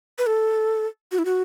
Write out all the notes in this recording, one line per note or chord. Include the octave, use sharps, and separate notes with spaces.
B4
A4
F#4
E4
F#4